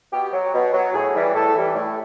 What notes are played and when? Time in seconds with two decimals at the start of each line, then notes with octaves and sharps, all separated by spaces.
0.12 B2 G4
0.33 F#3
0.53 B2
0.73 F#3
0.93 A2 G#4
1.13 E3 G3
1.34 A2 A4
1.55 E3 G3
1.75 A2